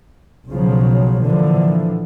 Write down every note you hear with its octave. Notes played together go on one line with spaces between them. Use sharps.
B1 C#3 F3 F#3
A#2 D3 E3 F3